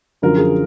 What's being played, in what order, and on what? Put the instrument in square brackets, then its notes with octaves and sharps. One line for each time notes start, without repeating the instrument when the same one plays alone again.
[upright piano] F#2 D3 F3 A#4
G#4